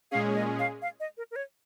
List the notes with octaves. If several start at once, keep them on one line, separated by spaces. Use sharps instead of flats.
A#2 G#3 C#4 G#4 F5
D#5
F5
F5
D#5
A#4
A#4
C#5